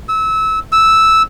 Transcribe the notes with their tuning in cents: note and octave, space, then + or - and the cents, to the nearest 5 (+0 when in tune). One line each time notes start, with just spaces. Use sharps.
E6 -25
E6 -5